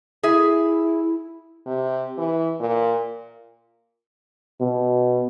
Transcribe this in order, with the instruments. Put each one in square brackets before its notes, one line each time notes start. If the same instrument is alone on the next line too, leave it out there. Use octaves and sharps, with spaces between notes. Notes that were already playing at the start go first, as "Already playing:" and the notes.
[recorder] E4 [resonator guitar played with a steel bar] G#4 E5
[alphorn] C3
E3
A#2
[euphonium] B2